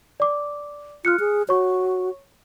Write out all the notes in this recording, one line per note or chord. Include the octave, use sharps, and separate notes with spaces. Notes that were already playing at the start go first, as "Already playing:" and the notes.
D5 D6
F4 F6 F#6 C#7
G#4
F#4 C#5 C#6